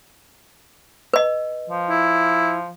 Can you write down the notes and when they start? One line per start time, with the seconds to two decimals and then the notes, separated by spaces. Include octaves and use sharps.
1.14 B4 D#5
1.70 F3
1.89 E4